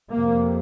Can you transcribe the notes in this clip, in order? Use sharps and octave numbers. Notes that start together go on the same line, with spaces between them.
F2 C3 A#3